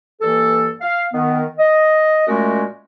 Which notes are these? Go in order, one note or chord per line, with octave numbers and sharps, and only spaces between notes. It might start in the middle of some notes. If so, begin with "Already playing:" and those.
G2 E3 A#3 A4
F5
D#3 B3
D#5
A#2 G#3 A3 C#4 F#4 A#4